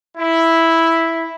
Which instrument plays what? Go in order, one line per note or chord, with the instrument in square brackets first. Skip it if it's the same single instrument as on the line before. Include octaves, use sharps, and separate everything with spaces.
[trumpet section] E4